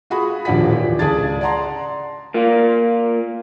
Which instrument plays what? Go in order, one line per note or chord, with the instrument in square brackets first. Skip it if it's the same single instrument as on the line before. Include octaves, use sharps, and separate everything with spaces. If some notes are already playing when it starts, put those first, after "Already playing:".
[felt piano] F4 F#4 G#4 B5
D#1 D3 F3 D5 F#5 B6
E3 G4
C#2 G#4 D5 A5 G#6 A6
D5 F#5 A5 A#5 C6
[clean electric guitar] A#3 F4